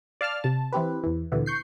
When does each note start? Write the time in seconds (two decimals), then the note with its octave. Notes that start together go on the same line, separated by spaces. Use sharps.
0.21 D5 F5 A5 F6
0.44 C3 A5
0.73 E3 C4 G4 B4
1.04 E2 E3
1.32 D2 A#2 D3 E3 B3
1.46 C#6 G6 C7